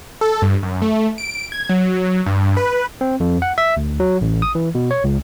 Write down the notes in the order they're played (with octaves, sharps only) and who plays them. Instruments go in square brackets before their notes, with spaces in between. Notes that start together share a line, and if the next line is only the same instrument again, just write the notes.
[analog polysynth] A4
G2
F#2
A3
D7
G#6
F#3
G2
B4
[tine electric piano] C4
F2
F#5
E5
D2
F#3
A1
D#6
E3
B2
C#5
C#2